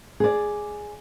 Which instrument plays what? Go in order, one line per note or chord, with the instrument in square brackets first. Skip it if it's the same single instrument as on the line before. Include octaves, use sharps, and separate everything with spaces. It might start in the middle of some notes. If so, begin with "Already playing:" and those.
[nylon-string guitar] G#4 D5